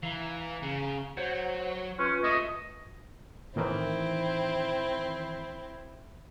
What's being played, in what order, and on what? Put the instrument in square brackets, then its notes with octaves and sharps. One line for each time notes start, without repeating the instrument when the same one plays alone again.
[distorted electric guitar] E3 [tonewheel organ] F5 A#5
[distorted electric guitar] C#3
[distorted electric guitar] F#3 [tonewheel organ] C5 C#5 F#5
[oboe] C#4 [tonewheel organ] F4 B4
[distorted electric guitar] A3 [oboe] D#5
[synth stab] A2 D#3 E3 [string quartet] C4 E4